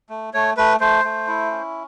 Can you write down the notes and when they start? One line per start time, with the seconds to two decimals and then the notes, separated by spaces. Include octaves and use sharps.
0.09 A3
0.34 A3 C#5
0.57 A3 B4
0.80 A3 C5
1.04 A3
1.27 E4
1.51 C#4